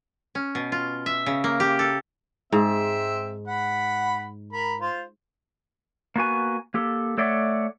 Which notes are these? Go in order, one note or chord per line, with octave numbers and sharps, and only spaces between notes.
C#4
B2
F4
E5
C#3
A#3
G4
A4
G#2 C4 E5
F#5 B5
A#4 B5
F4 C5
A#3 B3 F#4 G#5
A#3 G4 A4
A3 A4 C#5 D5 E5 F#5